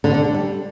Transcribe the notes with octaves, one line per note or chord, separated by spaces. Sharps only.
D3
D3
D4
G3